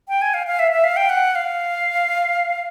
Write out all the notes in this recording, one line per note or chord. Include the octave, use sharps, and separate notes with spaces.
G5
G#5
F5
F5
E5
E5
F5
G5
F#5
F5